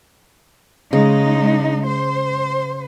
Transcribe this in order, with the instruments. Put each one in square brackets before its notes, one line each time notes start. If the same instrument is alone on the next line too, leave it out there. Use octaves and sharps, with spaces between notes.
[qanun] C#3 [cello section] G#3 D#4
[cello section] C5